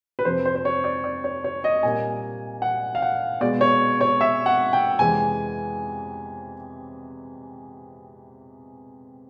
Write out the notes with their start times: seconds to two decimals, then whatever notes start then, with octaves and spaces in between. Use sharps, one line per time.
0.19 B4
0.25 F2 C3 F3 C5
0.45 C5
0.55 C5
0.65 C#5
0.84 D5
1.04 D5
1.24 C#5
1.44 C#5
1.64 D#5
1.83 A#2 G3 A#3 G#5
2.62 F#5
2.95 F5
3.02 F#5
3.41 B2 G#3 D5
3.61 C#5
4.01 C#5
4.21 E5
4.46 F#5
4.73 G5
4.99 F2 C3 E3 G#3 G#5